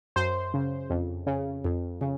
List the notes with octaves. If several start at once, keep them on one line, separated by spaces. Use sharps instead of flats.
F#2 C5
C#3
F2
C#3
F2
C#3